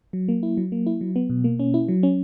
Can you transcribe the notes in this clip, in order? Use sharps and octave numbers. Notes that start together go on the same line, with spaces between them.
F#3
A#3
E4
F#3
A#3
E4
F#3
B3
B2
A#3
C#4
E4
F#3
C#4